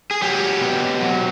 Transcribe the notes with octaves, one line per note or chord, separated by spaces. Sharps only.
G#4
F#3 G4
B2
F#3